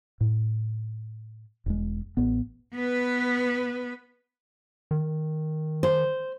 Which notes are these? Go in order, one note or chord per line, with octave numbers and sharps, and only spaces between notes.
A2
E1 G#3
A1 B3
B3 B4
D#3
C5